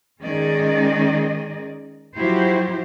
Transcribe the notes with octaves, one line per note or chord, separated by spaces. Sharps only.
D#3 G#3 C#4 G#4 D5 D#5
F3 F#3 E4 F#4 G4 C5